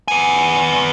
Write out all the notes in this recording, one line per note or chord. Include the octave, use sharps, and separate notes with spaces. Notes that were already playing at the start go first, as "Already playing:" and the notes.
B3 G#5